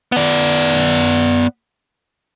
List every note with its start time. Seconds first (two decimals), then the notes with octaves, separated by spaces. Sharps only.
0.12 B3 D5